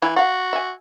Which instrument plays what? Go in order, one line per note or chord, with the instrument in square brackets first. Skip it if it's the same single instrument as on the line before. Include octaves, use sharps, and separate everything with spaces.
[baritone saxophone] E3 [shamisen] E4
[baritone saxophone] F#4 [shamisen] F5 F#5
[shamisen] E5 G#5